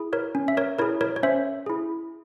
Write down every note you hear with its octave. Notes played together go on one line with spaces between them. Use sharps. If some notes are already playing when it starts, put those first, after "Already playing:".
Already playing: E4 G#4
A#4 C#5
C#4
E5
A#4 C#5
E4 G#4 A#4 C#5
A#4 C#5
C#5
C#4 C5 E5
E4 G#4